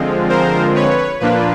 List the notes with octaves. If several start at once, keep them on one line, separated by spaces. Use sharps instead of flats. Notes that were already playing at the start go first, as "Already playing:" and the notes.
Already playing: D3 F3 G#3 C4 F4
A#4 C5
B4 C#5
A#2 F3 A#3 D4 F4 B4